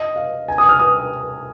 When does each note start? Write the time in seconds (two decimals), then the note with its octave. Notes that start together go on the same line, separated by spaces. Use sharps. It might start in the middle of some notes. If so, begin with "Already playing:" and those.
Already playing: D#5
0.16 F5
0.48 G#5
0.58 D#6
0.69 F6
0.80 D#6